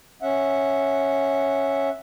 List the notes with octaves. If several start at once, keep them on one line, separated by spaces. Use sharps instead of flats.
C#4 E5 F#5